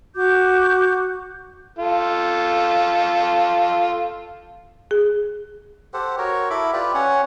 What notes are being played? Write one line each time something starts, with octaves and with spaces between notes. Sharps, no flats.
F#4 D6 G6
F4 A4
G#4
G4 A4 C5 F#5
F#4 A#4 C#5
E4 A4 B5 D6
F4 G4 B4 D5
C#4 C#5 F#5